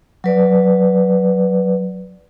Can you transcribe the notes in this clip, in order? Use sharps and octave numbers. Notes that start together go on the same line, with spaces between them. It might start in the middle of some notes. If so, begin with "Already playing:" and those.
F#3 B4 D5